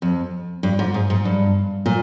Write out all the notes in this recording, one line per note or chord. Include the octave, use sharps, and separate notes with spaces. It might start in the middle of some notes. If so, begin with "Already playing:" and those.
F2
G2
G#2
G#2
G#2
G2
A#2